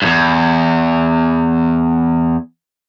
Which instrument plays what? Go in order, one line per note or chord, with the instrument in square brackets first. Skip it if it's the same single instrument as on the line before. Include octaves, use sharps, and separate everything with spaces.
[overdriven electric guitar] E2 G2